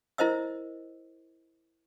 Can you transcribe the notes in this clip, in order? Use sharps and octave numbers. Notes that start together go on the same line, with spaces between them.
E4 A#4 C5 D#5 E6